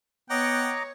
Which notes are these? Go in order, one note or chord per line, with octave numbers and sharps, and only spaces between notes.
B3 C#5 D#5 F#5 G5 A#5 D6